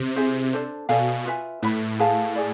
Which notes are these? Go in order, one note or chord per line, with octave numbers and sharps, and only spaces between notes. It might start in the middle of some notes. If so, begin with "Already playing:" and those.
Already playing: C3
E4 G#4 C5 E5
D4 A4 C5
B2 A4 D5 F5 G#5
F4 B4 E5 G#5
A2 B4 E5 B5
G#4 B4 F5 A5
G#4 B4 D5